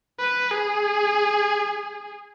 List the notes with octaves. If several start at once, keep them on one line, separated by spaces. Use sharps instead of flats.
B4
G#4